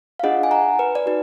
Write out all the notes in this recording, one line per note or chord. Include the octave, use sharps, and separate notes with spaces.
F5
D4 F4 G#4 D#5 F#5
G#5
F#5 A#5
B4
D5
D#4 F#4 B4